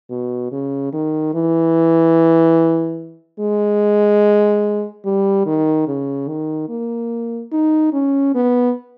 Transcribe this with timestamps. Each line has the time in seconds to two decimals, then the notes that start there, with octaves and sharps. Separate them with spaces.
0.10 B2
0.52 C#3
0.93 D#3
1.34 E3
3.40 G#3
5.05 G3
5.46 D#3
5.88 C#3
6.28 D#3
6.69 A#3
7.52 D#4
7.93 C#4
8.35 B3